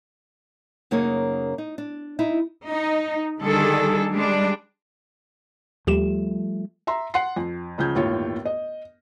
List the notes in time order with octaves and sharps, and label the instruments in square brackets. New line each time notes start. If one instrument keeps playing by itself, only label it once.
[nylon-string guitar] F#2 C#3 A#3 D#4 C#5
D#4
D4
D#4 E4
[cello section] D#4
D3 D#3 G3 D4 G#4 A4
G3 G#3 D4
[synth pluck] D#2 G4 E7 [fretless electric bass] F3 G3 A3
[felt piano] E5 A#5 C6
F#5 C6 C7
F2
C#2 C#3 F3 G6 G#6
G1 D#2 A2 F4 C#5
D#5